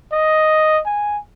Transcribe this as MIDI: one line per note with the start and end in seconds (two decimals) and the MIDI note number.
0.12 0.81 75
0.86 1.18 80